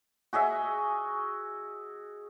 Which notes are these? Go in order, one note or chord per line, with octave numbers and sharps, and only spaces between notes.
F#4 G#4 D#5 E5